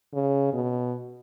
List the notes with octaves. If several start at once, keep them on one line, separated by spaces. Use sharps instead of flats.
C#3
B2